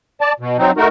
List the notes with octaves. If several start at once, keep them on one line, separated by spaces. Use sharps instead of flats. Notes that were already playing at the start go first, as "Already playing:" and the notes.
D5 A5
B2
F#3 C4 D#4
A3 D#4 F#4 A#4